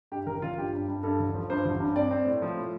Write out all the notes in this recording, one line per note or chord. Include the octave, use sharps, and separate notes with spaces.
G2 G4
A1 A#4
A1 F4
G2 G4
G2
G2
G2 A4
A1
F3
G2 C5
A1
G2
C4 D5
C4
A2
F3
A2